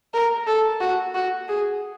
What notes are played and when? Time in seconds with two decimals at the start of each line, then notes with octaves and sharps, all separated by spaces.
0.14 A#4
0.47 A4
0.80 F#4
1.14 F#4
1.48 G#4